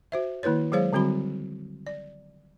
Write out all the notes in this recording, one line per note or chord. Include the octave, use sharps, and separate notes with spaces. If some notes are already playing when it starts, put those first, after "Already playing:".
F#4 C5 E5
D#3 A#3 E4 B4 C#5
F#3 G#3 G#4 C5 C#5 F5
D3 G3 C4 F#4 B5
D5